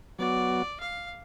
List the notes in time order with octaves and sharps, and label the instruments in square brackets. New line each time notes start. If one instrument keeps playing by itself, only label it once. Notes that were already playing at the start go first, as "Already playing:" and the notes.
[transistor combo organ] F#3 B3 F#4 [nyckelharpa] D5
[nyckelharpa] F5